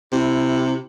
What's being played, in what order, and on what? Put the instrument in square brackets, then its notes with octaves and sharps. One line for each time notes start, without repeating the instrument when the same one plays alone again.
[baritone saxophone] C3 [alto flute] E4